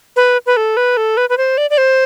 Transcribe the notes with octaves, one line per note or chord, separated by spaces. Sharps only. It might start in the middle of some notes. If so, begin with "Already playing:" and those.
B4
B4
A4
B4
A4
B4
B4
C5
D5
D5
C5